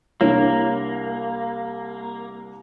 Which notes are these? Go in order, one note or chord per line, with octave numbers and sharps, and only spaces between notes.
C2 A#3 D4 E4 C#5